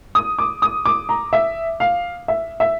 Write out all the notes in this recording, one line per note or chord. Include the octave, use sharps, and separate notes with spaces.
D#6
D6
D#6
D6
A#5
E5
F5
E5
E5